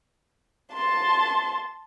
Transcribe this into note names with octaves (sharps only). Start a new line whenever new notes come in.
A5 C6